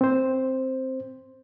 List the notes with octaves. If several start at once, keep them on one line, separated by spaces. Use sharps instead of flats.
C4 C5